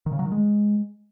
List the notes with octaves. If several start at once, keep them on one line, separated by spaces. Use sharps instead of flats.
D#3
C#3
F#3
D#3
G#3